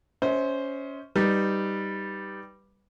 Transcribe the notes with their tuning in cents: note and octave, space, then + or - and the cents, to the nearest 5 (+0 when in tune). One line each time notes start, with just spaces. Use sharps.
C#4 +15 C5 +0 E5 -45
G3 +0 D#4 +0 B4 +0